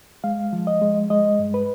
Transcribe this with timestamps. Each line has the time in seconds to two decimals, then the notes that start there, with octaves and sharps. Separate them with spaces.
0.24 G#3 F5
0.53 F3
0.67 D#5
0.81 G#3
1.10 G#3 D#5
1.39 G2
1.54 B4